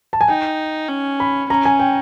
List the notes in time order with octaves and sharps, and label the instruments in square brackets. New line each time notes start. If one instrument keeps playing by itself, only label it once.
[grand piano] A5
G#5
[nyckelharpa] D#4 [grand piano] G5
[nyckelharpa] C#4
[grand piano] B5
[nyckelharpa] C#4 [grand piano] A#5
[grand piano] G#5
G5